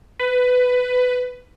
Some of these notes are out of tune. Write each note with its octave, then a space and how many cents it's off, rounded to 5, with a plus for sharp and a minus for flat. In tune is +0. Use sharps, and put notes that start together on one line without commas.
B4 +15